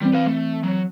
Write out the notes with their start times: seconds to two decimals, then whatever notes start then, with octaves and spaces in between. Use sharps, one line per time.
0.01 E3 G3 C4
0.13 B4 F5
0.27 A3
0.63 F#3